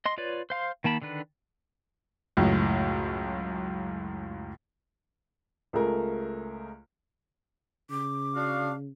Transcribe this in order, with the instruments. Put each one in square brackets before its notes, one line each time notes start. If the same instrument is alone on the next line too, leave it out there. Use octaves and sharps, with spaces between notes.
[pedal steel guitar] D#5 C6
F4 B4 C#5 D5
C5 F5 C6
D#3 A#3 A5 B5
D3 D#3 D4 B4
[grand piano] C#2 F#2 A2
[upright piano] C#2 A3 G#4 A#4
[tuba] C#3 [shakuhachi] D6
[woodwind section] D4 F#4 F5